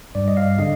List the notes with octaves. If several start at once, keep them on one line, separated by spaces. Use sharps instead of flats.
G2 D5
D#5
F5
D3 D#5